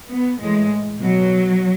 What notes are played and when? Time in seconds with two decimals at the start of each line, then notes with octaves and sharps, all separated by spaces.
0.11 B3
0.41 A2 E3 G#3
1.02 B2 F#3